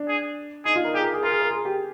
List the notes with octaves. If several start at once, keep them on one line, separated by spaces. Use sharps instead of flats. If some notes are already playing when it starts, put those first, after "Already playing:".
Already playing: D4
G#4
D#4 G#4
F4
A#4
G4 G#4
A#4
G#4
F4 A#4
G#4
A#4
G#4
G4